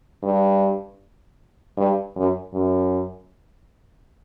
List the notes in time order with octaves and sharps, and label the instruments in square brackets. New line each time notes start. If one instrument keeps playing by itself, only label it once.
[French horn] G2
G2
F#2
F#2